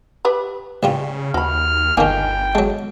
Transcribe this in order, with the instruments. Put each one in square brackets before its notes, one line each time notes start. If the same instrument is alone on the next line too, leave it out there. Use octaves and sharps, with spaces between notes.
[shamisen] G4 B4 B5
[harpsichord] A1 G3 F4 [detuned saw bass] C#3
[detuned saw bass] D#2 [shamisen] F#4 B5 [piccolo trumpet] F6
[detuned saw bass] G1 [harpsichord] D#3 A#3 [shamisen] A3 D#4 G#4 [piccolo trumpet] G5
[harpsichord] F#3 G#3 [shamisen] A4